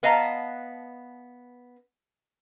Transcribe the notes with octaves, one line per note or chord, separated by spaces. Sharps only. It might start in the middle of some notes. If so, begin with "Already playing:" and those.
B3 B4 D#5 F5 A5 A#5